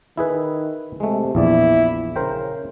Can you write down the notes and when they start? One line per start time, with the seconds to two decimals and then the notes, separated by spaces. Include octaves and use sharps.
0.17 D#3 E4 G#4 B4
1.00 C3 G#3 A3
1.35 A#1 E2 E4 D5
2.16 C#3 A#4 C5 G5